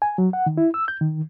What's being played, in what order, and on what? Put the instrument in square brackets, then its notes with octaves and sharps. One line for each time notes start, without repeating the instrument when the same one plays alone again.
[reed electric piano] G#5
F#3
F#5
D#3
E4
E6
G6
D#3